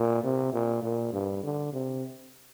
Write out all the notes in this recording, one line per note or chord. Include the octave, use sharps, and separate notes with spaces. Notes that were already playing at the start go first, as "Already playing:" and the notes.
Already playing: A#2
C3
A#2
A#2
G2
D3
C3